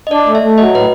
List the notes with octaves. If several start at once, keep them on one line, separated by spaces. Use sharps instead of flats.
D#5
D4 D5
A3
E5
A3
F#3 D#5
A2 B4